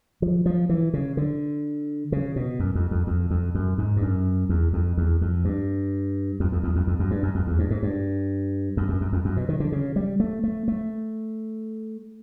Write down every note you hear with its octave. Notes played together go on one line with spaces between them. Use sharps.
F3
F3
E3
C#3
D3
C#3
B2
F#2
F2
F2
F2
F2
F#2
G#2
G2
F#2
E2
F2
E2
F2
G2
F2
F2
E2
F2
F2
F#2
G2
F#2
F2
E2
G2
G#2
G2
F#2
F#2
F#2
F2
F#2
B2
D#3
D3
C#3
G3
A3
A3
A3